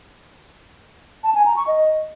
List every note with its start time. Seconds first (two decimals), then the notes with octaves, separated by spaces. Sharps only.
1.24 A5
1.35 G#5
1.45 A#5
1.56 C#6
1.67 D#5